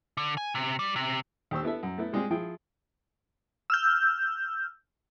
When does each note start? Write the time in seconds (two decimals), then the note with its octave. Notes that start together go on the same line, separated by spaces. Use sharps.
0.17 D3
0.37 G#5
0.55 C3
0.79 G3
0.96 C3
1.51 D#2 G4 C5 C#6 E6
1.63 B3 E4 A4 E5
1.83 F#2
1.98 A3 B3 E4
2.13 G3 G#3 C4 F4 G4 G#4
2.30 F3 E4 G#4 G5
3.70 E6 F6 G6